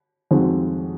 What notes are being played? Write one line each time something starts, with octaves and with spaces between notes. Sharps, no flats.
F2 D#3 G#3 C4 F#4